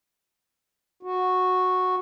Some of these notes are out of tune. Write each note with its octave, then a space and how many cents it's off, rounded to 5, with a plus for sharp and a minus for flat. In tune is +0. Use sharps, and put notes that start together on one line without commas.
F#4 -10